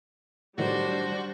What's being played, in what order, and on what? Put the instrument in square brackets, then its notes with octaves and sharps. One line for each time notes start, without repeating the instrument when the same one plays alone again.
[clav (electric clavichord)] A2 D#3 F#3 [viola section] G3 D4 [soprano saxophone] F#4 [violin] C5